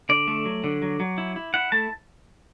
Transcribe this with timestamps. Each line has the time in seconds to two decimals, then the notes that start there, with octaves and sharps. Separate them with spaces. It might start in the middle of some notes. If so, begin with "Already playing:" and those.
0.09 D3 D5
0.27 A3
0.45 F#3
0.64 D3
0.82 F#3
1.00 F#3
1.18 E4
1.36 E4
1.54 E4 F#5
1.72 A3 A5